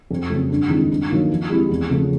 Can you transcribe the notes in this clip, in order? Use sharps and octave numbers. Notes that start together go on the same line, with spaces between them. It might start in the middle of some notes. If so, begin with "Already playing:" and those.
F2
C#3 F#3 A3
G2
D#3 G#3 C4 E4
G2
D#3 F#3 A#3 D#4
F3
G#3 C4 E4 G4
E2
C#3 F3 A3